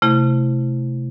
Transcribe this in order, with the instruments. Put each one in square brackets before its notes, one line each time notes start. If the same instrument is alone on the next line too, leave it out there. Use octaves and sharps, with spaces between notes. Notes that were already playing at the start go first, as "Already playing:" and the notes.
[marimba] C3 A3 E4